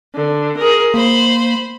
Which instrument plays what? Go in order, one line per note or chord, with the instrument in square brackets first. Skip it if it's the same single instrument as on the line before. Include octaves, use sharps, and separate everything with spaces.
[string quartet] D3
G#4 A#4
[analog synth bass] A#3 [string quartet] C5 B5